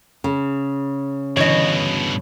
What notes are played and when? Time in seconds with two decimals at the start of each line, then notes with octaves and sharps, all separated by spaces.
0.24 C#3
1.37 G2 B2 D3 E3 C#5 D#5